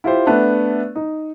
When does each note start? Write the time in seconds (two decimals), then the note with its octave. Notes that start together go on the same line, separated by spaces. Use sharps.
0.04 E4 F4 G4 C5
0.27 A3 B3 D4
0.96 D#4